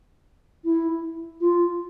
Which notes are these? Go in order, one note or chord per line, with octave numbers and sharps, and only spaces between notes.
E4
F4